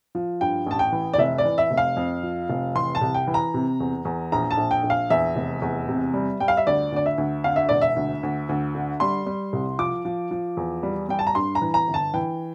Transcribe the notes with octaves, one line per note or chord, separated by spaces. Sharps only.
F3
G2 G5
A1 A5
G5
E3
D5
F1 E5
D5
E3
E5
F1
F5
F2
F3
F1
E3 C6
A5
C2
G5
E3
A#5
C3
E2
E2
A#1 A#5
A5
A#1
G5
A#1
F5
E2 E5
F1
E2
C3
G3
G3 G5
F5
E5
D2 D5
D2 D5
E5
D2
D3 F5
E5
E1 D5
E5
D2
D2
D2
D3
G3 C6
G3
C2
F3 D6
F3
F3
E2
G3
G3 G5
A5
A#5
G2 C6
A#5
E3
A#5
G1
A5
E3 G5